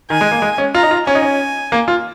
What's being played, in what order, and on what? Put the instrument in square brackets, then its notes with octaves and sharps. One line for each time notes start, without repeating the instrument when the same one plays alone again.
[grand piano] D#3 [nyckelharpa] G#5
[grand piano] G#3
A#3
G#3
C#4
[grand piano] F4 [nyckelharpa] A#5
[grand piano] D#4
F4
[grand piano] C#4 [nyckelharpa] G#5
[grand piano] D#4
C#4
A#3
F4